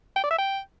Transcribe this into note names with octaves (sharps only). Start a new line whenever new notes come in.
G5
D5
E5
G5